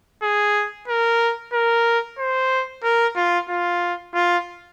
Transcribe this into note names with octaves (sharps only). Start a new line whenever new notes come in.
G#4
A#4
A#4
C5
A#4
F4
F4
F4